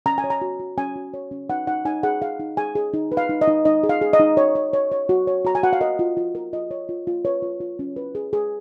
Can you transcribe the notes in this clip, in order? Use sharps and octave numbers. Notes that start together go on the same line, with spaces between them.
C#4 A#5
G#5
C#5
A#5
F#4
F#4
C#4 G#5
F#4
C#5
C#4
D#4 F#5
D#4 F#5
D#4 G#5
G#4 F#5
G#4 F5
D#4
G#4 G#5
G#4
D#4
B4
F5
D#4
D#5
D#4
D#4 D#5
G#4
F5
G#4
D#5
D#4
C#5
C#5
C#5
C#5
F#4
C#5
F#4 A#5
G#5
F#4 F#5
F5
A#4 D#5
F4
F4
A#4
F4 D#5
C#5
F4
F4
B4 C#5
F4
F4
C#4
B4
G#4
G#4